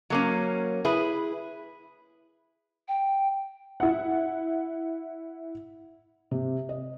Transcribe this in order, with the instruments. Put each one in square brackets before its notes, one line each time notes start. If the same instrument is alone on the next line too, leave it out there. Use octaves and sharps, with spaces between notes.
[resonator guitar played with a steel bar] F#3 A#3 C#4
E4 G#4 B4
[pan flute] G5
[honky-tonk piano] E4 F#5
[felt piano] C3
D#5